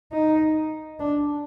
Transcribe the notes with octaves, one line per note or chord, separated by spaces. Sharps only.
D#4
D4